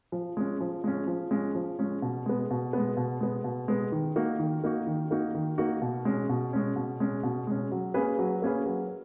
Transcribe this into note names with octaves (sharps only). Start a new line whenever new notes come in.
F3
G#3 C#4
F3
G#3 C#4
F3
G#3 C#4
F3
G#3 C#4
B2
G#3 B3
B2
G#3 B3
B2
G#3 B3
B2
G#3 B3
D#3
A#3 D#4 F#4
D#3
A#3 D#4 F#4
D#3
A#3 D#4 F#4
D#3
A#3 D#4 F#4
B2
G#3 C#4
B2
G#3 C#4
B2
G#3 C#4
B2
G#3 C#4
F#3
A#3 C#4 G#4 B4
F#3
A#3 C#4 G#4 B4
F#3